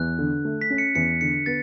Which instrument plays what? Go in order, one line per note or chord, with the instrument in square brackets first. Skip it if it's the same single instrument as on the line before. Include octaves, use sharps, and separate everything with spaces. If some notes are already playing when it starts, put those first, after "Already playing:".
Already playing: [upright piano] E2 [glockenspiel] F#6
[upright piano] D3
A3
[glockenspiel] B6
[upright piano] C#4
[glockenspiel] C#7
[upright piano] E2 [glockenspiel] C#7
[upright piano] D3 [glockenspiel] C#7
[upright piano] B3 [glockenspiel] A6